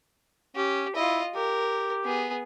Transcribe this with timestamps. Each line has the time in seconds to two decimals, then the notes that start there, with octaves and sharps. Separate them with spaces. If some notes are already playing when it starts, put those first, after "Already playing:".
0.56 C#4 G4
0.96 E4 F4 D#5
1.35 G4 A#4
2.05 B3 G#4